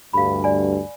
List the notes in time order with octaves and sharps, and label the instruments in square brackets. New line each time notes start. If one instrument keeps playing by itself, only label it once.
[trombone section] D2 G2 [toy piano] F5 B5
[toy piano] D5 G#5